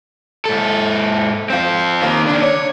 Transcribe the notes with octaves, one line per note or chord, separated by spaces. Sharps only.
G#2 A4
C4 F4
D#3 A#3
C#3 D4
C#5